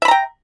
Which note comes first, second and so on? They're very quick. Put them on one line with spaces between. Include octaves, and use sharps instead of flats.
E5 B5 A#5 G5